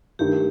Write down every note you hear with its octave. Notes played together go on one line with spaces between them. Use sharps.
G2 D#3 A3 G4